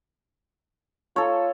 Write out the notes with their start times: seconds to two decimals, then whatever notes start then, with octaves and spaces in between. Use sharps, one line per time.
1.16 F4 A4 C#5